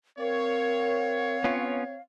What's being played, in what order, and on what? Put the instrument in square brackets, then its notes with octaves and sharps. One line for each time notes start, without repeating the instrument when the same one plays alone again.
[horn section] C4 C#5 [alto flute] A#4 [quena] F5
[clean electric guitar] B3 C#4 F4